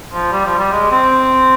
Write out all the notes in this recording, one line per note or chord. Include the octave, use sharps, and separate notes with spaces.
F3
G3
F3
G3
G#3
C4